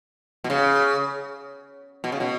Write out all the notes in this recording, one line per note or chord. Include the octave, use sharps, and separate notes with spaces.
B2
C#3
B2
C#3
B2